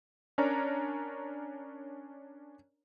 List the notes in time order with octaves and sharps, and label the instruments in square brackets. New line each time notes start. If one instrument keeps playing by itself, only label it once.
[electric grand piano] C#4 D4 A#4 C#5 D5 A#5